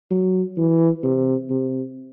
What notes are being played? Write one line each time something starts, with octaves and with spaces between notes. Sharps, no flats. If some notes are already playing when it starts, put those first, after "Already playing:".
F#3
E3
C3
C3